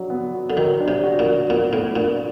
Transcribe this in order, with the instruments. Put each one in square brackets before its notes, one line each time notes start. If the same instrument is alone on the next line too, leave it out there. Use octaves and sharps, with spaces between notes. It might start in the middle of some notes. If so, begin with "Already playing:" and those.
Already playing: [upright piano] F#3 D4
B3
F#4
[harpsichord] D3
[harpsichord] D#3 [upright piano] F#3
[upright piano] D4
[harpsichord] C3
[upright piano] F#4
[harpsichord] A#2
[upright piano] F#3
[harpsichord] A#2 [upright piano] B3
[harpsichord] A2 [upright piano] B3
[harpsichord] A#2 [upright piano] D4